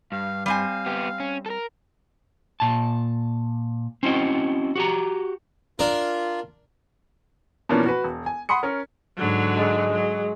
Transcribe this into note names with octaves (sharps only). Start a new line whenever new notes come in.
G2 F5
G3 C4 F5 G#5
B3 G4
C#4
A4 A#4
A#2 A5
C4 C#4 E4 F#4 D#5
F#4 G4 A#5
D4 F4 A#4
B2 E3 F3 A#3 C#4 D4
F#4 B4
E1
G#5
F#5 B5 C6 D#6 C#7
C#4 A#4
G#2 D3 F#3
G#3
F#3